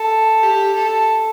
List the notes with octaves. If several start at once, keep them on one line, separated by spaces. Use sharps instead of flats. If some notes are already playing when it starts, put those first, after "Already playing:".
Already playing: A4
G4
A4